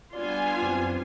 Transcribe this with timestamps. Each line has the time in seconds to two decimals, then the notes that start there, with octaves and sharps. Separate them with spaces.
0.13 G3 B3 D4 F4 D5 G#5 C6
0.62 F#2 C4